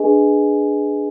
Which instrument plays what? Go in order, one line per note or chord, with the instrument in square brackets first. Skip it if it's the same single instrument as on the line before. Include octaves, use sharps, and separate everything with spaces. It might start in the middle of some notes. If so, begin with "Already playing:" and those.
Already playing: [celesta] D4 G#4 B4 D#5 G#5